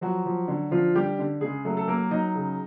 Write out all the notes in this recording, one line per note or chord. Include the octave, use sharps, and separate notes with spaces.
F3 F#3 F#4
F3
D3
D3 F3 F4
D3 G3 G4
D3
C#3 G#3 G#4
F#3 A3 A4
A4
F#3 A#3 A#4
F#3 D#4 D#5
C#3